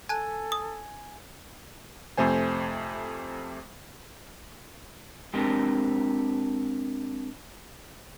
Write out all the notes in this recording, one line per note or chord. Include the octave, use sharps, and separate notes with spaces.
A4 G#5 A5 F#6
D#6
F2 C3 A3 C5 G#5
G#3 C4 D4 G4 A#4